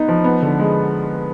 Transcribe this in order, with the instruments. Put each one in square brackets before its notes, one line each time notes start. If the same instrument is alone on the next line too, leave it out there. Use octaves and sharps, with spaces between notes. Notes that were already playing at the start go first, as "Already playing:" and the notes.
Already playing: [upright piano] B3 D#4
F3
B3
D3
G#3